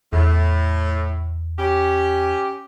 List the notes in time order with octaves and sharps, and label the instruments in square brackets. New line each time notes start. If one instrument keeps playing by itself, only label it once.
[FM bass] E2 [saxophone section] A2
[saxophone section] C#4 G4